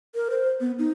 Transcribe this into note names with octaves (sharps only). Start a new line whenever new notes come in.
A#4
C5
B3
D#4